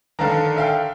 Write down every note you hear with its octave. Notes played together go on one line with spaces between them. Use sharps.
D3 D#3 F5 A5 A#5
E5 F5 G5